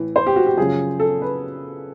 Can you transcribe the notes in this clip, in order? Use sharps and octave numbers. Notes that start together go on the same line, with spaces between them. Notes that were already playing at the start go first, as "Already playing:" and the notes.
Already playing: A2 E3
C5
G4
F#4
G4
F#2 C#3 F3 G#4
A4
B4